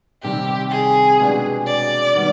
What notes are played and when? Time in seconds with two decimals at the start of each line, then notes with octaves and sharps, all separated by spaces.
0.23 C3 D#3 G3 C4 G4
0.71 G#4
1.20 B2 G#3 B3 D4 G4
1.67 D5
2.15 D#3 G3 B3